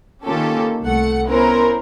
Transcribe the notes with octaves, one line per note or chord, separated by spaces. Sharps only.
D#3 A#3 C#4 F4 G4 A4
C2 A3 F#5 C#7
B3 C#4 E4 A#4 C5